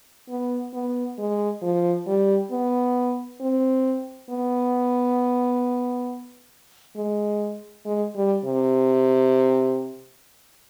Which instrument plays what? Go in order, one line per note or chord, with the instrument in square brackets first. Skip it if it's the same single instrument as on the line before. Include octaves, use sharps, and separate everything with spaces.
[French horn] B3
B3
G#3
F3
G3
B3
C4
B3
G#3
G#3
G3
C3